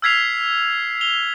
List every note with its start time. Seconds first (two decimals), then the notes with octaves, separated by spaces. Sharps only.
0.02 E6 F6 G#6 B6 C7 F7
1.01 F7 G7